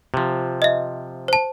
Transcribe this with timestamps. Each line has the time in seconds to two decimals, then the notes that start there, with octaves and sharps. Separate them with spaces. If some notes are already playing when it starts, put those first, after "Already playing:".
0.14 C3 F3
0.62 D#5 E5
1.28 C5 A5